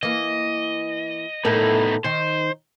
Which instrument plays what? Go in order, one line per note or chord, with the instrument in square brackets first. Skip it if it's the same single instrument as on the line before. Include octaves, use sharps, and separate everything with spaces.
[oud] E3 A#3 [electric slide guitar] D#5
[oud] A2 A4 A#4 [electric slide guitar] B3 D#4 E4
[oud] D#3 D#4 [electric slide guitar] C5